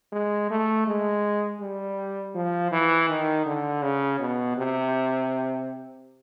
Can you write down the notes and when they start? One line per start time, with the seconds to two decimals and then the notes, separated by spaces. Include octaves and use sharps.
0.13 G#3
0.50 A3
0.87 G#3
1.61 G3
2.35 F3
2.72 E3
3.09 D#3
3.46 D3
3.83 C#3
4.20 B2
4.57 C3